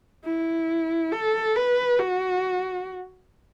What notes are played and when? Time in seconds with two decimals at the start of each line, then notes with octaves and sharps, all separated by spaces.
0.25 E4
1.12 A4
1.56 B4
1.99 F#4